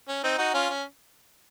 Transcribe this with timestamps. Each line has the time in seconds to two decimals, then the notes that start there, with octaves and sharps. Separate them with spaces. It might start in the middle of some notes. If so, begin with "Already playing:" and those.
0.09 C#4
0.24 C4 D#4
0.38 D#4 F#4
0.54 C#4 F4
0.70 C#4